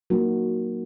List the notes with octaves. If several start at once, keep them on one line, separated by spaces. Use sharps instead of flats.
F#3 A#3 D#4 F#4 A#4